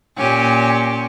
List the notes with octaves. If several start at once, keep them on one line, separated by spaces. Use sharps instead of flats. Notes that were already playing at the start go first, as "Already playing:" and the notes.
A#2 C#4 G4